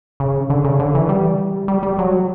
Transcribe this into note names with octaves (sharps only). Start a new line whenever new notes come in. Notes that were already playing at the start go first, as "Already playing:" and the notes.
C#3
D3
C#3
D3
E3
G3
G3
G3
F#3